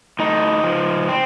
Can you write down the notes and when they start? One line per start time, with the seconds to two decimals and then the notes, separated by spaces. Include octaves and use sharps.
0.19 A2 D#4
0.64 F3
1.09 C4